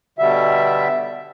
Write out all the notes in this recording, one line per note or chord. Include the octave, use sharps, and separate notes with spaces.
B2 D3 G3 E5